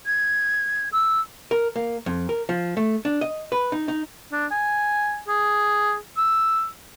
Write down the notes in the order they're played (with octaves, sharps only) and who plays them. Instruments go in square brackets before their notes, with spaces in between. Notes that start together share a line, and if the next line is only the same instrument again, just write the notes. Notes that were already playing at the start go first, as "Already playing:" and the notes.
[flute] G#6
E6
[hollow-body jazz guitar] A#4
A#3
F2
A#4
F3
A3
D4
D#5
B4
D#4
D#4
[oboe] D4
G#5
G#4
E6